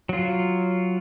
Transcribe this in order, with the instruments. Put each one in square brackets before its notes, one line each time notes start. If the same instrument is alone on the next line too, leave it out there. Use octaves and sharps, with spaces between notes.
[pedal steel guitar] F#3 F4